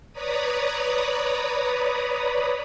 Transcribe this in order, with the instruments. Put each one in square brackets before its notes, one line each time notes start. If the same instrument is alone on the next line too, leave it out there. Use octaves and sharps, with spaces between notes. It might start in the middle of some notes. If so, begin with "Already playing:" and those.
[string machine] B4 C#5 D5 A#5 B5 D#6